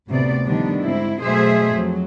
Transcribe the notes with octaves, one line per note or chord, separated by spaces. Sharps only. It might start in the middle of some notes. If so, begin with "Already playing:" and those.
D2 A2 C3 B3 D5
D3 D#3 F3 G3 B3 D4
G#2 D3 C4 E4
B2 F#3 A3 G#4 C5 E5
F2 F#3